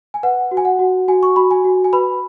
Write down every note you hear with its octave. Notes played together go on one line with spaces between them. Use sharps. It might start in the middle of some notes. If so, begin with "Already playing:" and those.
G#5
B4 F#5
F#4
G#5
F#5
F#4
F#4 G#5
C#6
F#4 B5
G#5
F#4
G#5
B4 B5